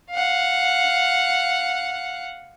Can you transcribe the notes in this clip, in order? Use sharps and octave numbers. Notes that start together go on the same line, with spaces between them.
F5 F#5